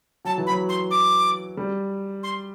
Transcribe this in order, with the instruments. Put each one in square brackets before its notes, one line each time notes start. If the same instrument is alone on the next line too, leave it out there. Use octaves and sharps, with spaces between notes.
[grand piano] F#3 [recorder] A5
[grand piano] E3
[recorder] B5
[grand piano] F#3
[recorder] C6
D6
[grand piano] G3
[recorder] C6